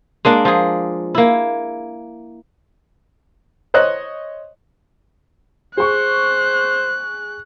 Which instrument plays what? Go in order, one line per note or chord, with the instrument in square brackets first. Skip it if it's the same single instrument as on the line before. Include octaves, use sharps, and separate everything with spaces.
[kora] G#3 A#3 D4
F3 G#4
A#3 E4
[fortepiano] C5 C#5 D#5 F#6
[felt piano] G#4 C#6 [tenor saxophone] C5 [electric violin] F#6